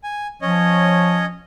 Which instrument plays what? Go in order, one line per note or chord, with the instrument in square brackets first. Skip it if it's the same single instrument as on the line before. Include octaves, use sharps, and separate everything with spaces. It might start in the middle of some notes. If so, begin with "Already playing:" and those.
[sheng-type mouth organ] G#5
[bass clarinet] F3 [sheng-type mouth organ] C#4 C#5 D#5